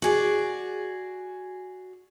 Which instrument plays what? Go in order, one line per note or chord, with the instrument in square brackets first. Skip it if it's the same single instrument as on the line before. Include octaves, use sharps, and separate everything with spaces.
[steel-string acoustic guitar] F#4 G#4 D5